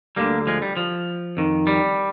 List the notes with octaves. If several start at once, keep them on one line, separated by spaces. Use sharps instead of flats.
D2 D3 G3 A#3
F3 G#3
G3
F3
F2 D#3
G3